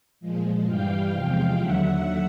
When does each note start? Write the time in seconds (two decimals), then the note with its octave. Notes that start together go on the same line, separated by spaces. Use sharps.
0.21 A#2 F3 G#3
0.67 G2 E3 G3 F5 G5
1.13 E2 C3 F3 G#3
1.59 D#2 D3 F#3 E5 F#5